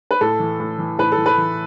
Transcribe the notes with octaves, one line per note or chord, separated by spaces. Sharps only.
B4
A2 A4
E3
A2
E3
A2 B4
A4
E3
B4
E3